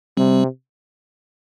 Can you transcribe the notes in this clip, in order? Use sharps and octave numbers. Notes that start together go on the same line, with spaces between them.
C3 G3 C4